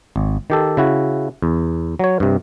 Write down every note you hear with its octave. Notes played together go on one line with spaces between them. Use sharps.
G#1
D#3 G4 A4
C#3 E4 F#4
E2
F#3 C#5
G2 C3